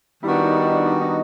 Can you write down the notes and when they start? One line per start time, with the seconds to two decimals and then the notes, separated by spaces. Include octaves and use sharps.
0.23 D#3 G3 B3 D4 E4 F#4
0.44 D#4
0.64 E4
0.85 D#4
1.01 D#4